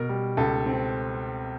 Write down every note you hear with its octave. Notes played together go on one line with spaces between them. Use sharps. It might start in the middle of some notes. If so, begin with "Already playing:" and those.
Already playing: B2 A#4
G3
C#2 A4
C4